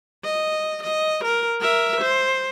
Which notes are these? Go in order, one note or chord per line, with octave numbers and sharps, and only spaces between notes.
D#5
D#5
A#4
A#4 E5
C5